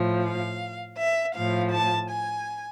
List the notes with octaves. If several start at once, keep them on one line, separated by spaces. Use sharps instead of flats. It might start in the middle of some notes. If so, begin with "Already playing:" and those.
Already playing: A2 F3
F5
E5
A2 F3 F5
A5
G#5